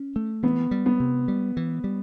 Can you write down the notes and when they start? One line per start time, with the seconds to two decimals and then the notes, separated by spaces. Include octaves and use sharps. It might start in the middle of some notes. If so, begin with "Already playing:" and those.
Already playing: C#4
0.16 A3
0.43 E3 B3
0.71 G3
0.86 B3
1.00 C3
1.28 G3
1.57 E3
1.84 G3